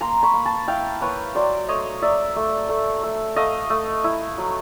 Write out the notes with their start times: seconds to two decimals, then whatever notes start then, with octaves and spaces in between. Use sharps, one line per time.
0.01 A#3 A#5 C6
0.23 B5 C#6
0.34 A#3
0.45 A5 B5
0.68 E4 F5 G5
1.01 A#3 B4 C#5
1.35 F#3 C5 D5
1.68 A3 C#5 D#5
2.02 F#3 D5 E5
2.36 A3
2.69 A3
3.03 A3
3.36 A3 D#5 F5
3.70 A3
4.04 E4
4.38 F#3